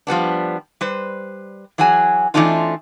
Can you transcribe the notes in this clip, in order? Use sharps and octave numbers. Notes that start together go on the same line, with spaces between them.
F3 G3 B3 D4
G3 B4 C5
E3 F#3 F#4 G#4 G#5
E3 A3 C4 D4 D#4 F4